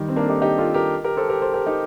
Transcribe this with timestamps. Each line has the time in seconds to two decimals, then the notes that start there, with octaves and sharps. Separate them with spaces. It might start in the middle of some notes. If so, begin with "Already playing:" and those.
Already playing: D#3 G3
0.08 C4
0.16 A#3 D4
0.25 A4
0.29 D#4 G4
0.42 D#4 G4
0.58 F4 A4
0.74 G4 A#4
1.04 G4 A#4
1.17 A4 C5
1.29 G4 A#4
1.42 A4 C5
1.54 G4 A#4
1.66 D#4 G4